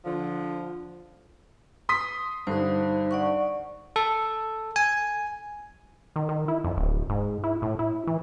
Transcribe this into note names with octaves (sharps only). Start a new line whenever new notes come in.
D3 F3
C6 D#6 B6
G2 D3 D#4 C5
D5 F#5 C#6
A4
G#5
D#3
D#3
E4
F2
D1
G#2
E4
A2
E4
E3